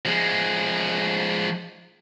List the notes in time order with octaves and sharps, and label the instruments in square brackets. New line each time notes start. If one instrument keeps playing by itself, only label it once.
[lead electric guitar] F3 G#3